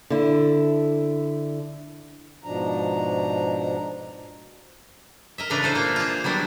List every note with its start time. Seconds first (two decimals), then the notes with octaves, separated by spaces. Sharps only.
0.10 D3 E4
2.44 G#2 B2 F3 D4 A#5
5.38 A#4 D#5 E5
5.50 A2 C#3 E3 D4 B4 A#5
5.63 E3 A4 C5 F5
5.75 A#3 F4
5.96 F4 G#4
6.24 F#3 G3 B3 D4 E4